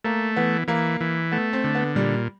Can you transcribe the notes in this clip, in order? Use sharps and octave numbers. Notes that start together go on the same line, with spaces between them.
A3 A#3
E3 B3
E3 A#3
E3
A3 B3
C4
D3
B3
A#2 G3